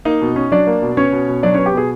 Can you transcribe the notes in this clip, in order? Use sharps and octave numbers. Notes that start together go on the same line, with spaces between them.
A#3 D#4 D#5
B2
C#4
F#3 D4 D5
A#3
B2
B3 C#4 C#5
B2
B2
F#3 D4 D5
B3 C#4 C#5
G4
B2 G#4